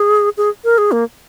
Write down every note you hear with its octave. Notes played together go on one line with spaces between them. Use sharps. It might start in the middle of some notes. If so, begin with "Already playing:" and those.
Already playing: G#4
G#4
A#4
G#4
A#3